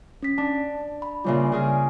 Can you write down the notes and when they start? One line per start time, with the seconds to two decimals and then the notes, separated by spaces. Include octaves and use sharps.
0.23 C#4 B6
0.38 D4 A5
1.02 B5
1.24 A#2 C#3 G3 F4 C#5 E5
1.52 C#3 G#4 A#4